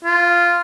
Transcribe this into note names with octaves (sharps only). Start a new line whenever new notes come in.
F4